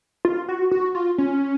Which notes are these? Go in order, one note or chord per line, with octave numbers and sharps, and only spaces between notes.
F4
F#4
F#4
F4
C#4